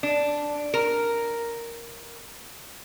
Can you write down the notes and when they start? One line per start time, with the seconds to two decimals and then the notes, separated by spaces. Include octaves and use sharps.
0.03 D4
0.74 A#4